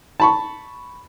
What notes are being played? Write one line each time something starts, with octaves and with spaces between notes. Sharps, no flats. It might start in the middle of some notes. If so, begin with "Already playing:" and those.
A5 B5 C#6